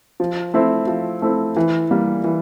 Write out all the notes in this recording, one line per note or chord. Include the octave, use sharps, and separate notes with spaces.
F3
A3 C4 E4
F3
A3 C4 E4
E3
G3 A#3
E3